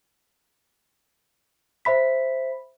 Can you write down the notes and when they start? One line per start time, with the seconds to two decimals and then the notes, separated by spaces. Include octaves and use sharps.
1.85 C5 E5 B5 B6